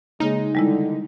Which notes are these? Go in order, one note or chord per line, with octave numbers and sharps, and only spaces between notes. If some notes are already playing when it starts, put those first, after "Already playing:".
C#3 G#3 A#3 D#4
D3 D#3 G3 G#3 E4